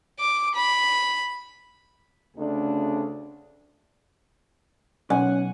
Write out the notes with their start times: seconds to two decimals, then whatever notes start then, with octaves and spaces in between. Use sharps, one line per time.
0.19 D6
0.55 B5
2.36 D2 C#3 A3 D4
5.10 B1 C#4 F#5 G#5